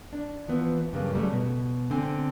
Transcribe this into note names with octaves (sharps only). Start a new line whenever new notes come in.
D4
E3 F3 B3
G2 C#3 F#3 A#3
A#2 C#3 F#3 G3 A3
B2
D3 C4 G#5